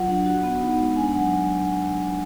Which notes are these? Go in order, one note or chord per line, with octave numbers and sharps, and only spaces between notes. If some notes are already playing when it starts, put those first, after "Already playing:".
Already playing: F#3 F4 F#5
D4
F#4 F#5
B3
D#4
G#3
D4 G#5
F#3 F#5